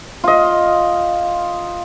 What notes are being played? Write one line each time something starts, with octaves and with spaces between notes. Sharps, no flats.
F4 D#5